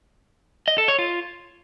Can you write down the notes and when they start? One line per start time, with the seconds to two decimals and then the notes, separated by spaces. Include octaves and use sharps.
0.68 D#5
0.78 A4
0.88 C#5
0.99 F4